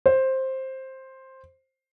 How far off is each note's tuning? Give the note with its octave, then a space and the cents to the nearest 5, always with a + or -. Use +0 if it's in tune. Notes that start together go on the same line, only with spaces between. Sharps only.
C5 +10